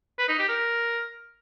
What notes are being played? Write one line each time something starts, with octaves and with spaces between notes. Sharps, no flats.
B4
D#4
G4
A#4